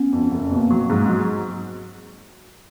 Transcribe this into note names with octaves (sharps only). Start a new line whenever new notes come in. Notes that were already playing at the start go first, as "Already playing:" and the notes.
Already playing: B3 C#4
F2
F#1
B2 A#3 C4
F#3
G#2
F#3